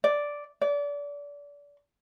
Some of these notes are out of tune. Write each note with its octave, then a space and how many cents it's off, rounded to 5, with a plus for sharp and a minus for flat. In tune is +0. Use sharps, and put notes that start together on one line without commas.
D5 -5
D5 -30